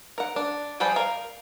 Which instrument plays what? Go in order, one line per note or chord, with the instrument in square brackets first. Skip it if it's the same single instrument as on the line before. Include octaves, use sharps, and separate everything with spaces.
[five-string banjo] A#4 F#5
D4
F3 G3 G#4 B4 G5
A#4 F5